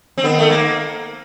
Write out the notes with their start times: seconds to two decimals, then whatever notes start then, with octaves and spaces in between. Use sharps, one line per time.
0.18 C4
0.24 D#3 B3
0.39 A3
0.50 A#3